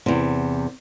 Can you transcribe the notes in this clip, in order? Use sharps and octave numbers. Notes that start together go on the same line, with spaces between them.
E2 C3